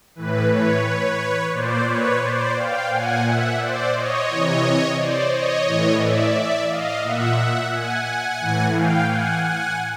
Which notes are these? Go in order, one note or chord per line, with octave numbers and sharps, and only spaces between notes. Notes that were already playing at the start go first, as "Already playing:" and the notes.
A2 E3 B4
B4 C#5
A#2 C5 D5
B4 C#5
C5 D5
F5 G5
A#2 F#5 G#5
E5 F#5
C5 D5
C#5 D#5
C3 E3
C5 D5
C#5 D#5
A2 E3
D5 E5
D#5 F5
A#2 E5 F#5
F#5 G#5
A2 E3
F5 G5
F#5 G#5
F#5 G#5